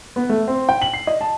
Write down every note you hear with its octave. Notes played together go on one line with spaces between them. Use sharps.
B3
A3
C4
G5
F#7
C7
D#5
A5